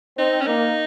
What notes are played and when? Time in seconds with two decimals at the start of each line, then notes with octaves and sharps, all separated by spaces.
0.17 C4 D#4
0.41 C#4
0.46 A#3 D#4